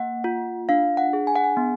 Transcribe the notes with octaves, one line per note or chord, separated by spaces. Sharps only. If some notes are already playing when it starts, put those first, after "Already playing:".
Already playing: A#3 F#5
F4
D4 F5
F#5
G#4
G#5
F#5
G#5
B3